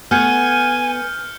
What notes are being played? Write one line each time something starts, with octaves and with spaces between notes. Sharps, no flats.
A3 B3 G#5 F6 G6 C#7